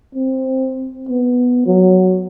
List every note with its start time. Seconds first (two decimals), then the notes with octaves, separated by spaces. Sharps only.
0.15 C4
1.09 B3
1.67 F#3